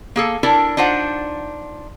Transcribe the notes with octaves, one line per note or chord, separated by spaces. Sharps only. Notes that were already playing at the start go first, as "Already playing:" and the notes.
A#3 G#4 A4
D4 E4 A4 A#4 D5
D4 D#4 F4 C5 F#5